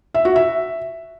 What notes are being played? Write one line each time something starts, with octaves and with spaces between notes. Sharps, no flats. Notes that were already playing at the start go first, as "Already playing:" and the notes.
E5
F#4
E5